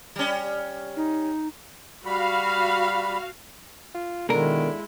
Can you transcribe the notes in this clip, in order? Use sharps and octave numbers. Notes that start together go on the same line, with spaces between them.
G3 C#4
D#4
G3 F#4 F5 B5
F4
B2 D3 D#3 G#3 E4 A#4